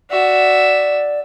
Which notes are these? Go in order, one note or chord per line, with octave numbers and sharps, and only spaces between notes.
F#4 D5 E5